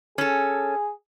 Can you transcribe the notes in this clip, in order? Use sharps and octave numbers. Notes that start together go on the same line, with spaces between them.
C#4 G#4 A4